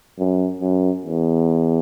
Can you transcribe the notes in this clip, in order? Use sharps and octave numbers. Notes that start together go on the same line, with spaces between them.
F#2
F#2
E2